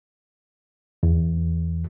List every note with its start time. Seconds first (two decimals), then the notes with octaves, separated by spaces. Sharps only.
1.03 E2